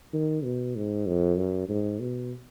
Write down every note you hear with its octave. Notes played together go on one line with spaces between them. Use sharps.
D#3
B2
G#2
F2
F#2
G#2
B2